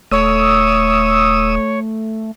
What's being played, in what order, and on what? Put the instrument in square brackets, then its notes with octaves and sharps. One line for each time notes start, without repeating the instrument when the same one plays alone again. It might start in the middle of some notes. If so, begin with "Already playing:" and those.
[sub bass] D#1 [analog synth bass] A3 [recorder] C#5 [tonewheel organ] D#6 E6